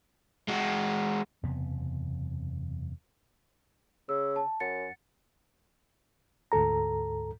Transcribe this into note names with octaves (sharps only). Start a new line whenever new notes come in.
G#3 F#4
F#1 E2 C3 B3
C#3 E6
A5
F#2 F#5 A6 C#7
D2 G#2 A4 A#5